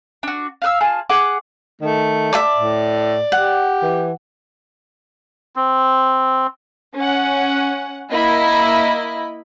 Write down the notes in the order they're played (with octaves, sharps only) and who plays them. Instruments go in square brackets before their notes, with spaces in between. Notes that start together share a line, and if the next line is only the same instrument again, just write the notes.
[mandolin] D4 F#4
F5 F#5 E6
F4 G#4 A5
G#4 F#5 D6
[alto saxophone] D#3 [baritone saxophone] A3
[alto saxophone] D5 [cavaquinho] E5 A5 D6
[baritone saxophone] A2
[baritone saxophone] G4 [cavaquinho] F#5
[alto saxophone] E3
[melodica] C4
[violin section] C#4 F#5
A#3 E4 D#5 B5